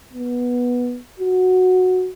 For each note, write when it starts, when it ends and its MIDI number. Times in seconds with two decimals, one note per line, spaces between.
0.13 0.99 59
1.20 2.10 66